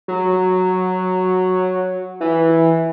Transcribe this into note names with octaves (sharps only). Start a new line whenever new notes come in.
F#3
E3